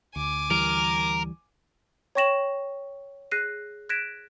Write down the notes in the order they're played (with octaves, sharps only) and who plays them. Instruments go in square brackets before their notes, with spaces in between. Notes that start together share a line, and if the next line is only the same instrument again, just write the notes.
[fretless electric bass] D2 [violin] G#5 D6
[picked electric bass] E3 G3 [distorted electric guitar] A#4
[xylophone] C#5 G5 C#6 A#6 E7 F#7
G#4 F#6 A#6 C7 D#7
F#6 G#6 A#6 B6 D7 E7